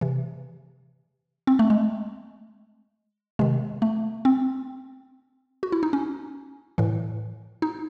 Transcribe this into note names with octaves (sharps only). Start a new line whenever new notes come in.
C3 E3
C4
A3
G#3
C3 D#3 G#3
A3
C4
F#4
E4
D#4
C#4
A2 E3
D#4